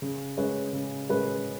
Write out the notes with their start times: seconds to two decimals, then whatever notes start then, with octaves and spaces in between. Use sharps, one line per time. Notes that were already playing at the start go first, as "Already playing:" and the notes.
0.02 C#3
0.37 G#3 C#4 B4
0.73 C#3
1.09 G#3 C#4 B4